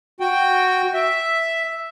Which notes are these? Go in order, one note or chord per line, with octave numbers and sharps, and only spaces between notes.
F#4 G5
E5